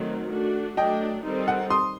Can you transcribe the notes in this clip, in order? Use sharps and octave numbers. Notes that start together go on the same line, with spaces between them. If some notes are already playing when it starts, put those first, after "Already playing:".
Already playing: D#3 F#3 A3 C4
A3 D4 F#4
F#3 A3 D4 D#5 G5
D#3 G3 C4 D#4 A4
F#5
C6 D#6